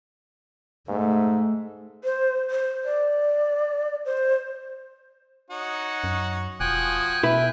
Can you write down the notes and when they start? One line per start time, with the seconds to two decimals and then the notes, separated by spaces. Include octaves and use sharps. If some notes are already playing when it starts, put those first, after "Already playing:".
0.88 G#2 A3
2.04 C5
2.50 C5
2.85 D5
4.05 C5
5.50 D#4 F#4 C#5
6.04 F#2
6.60 E1 F3 F#4 G5 G#5 D#6 F#6
7.23 B2 E4 B4